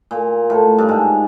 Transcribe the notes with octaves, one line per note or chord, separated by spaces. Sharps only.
A#2
A2
G2
G#2